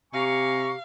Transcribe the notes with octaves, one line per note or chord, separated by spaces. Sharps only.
C3 G4 F5 G#5 A#5 C#6